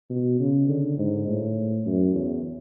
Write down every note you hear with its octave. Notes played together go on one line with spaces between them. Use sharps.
B2
C#3
D3
G#2
A2
F#2
E2